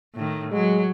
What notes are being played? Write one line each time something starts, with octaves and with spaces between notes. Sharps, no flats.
A2 D#3
F#3 G#3